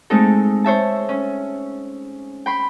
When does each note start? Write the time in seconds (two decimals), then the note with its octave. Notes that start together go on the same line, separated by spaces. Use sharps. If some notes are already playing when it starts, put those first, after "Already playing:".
0.10 G#3 A3 C4 D#4 A4
0.64 C5 C#5 E5 A5
1.09 C#4
2.46 G5 B5 C6